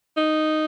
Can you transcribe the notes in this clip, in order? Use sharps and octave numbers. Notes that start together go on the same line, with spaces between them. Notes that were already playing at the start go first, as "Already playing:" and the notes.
D#4